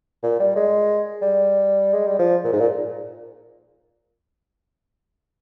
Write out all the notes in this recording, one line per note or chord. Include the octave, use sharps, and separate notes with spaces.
A#2
G3
G#3
G3
G#3
G3
F3
A#2
G#2
A#2